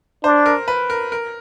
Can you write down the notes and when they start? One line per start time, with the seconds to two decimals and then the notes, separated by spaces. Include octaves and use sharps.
0.24 D4 C5
0.46 A#4
0.68 B4
0.90 A#4
1.12 A#4